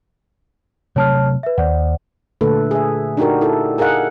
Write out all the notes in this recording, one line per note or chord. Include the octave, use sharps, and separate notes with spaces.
C3 F#3 A3 C#5 A5 F6
B4 E5
D#2 C5 D5 F#5
A#2 D3 A3 A4 B4
G#4 E5
D4 D#4 F#4 G4 A#4
E4 A4
G#4 A#4 D#5 F5 F#5